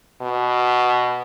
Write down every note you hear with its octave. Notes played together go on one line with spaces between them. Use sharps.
B2